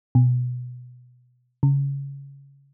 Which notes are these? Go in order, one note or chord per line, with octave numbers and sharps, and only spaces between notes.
B2
C#3